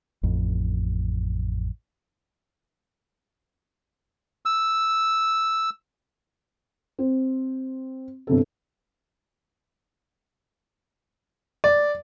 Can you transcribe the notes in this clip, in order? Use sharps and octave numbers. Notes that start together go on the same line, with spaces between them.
A1 F2
E6
C4
G1 C3 A4
D5